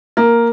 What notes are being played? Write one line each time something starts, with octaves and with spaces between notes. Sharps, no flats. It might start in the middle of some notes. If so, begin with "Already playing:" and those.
A#3